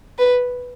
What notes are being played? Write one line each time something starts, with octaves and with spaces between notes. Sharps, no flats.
B4